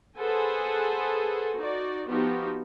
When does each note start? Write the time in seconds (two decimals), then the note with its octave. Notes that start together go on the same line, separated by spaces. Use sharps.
0.19 G#4 A4 B4 C5 F#5 G#5
1.57 D#4 F#4 D5
2.08 F3 B3 D#4 F#4 G4